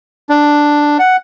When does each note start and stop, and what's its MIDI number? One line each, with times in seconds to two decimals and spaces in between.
0.29 0.98 62
0.99 1.16 78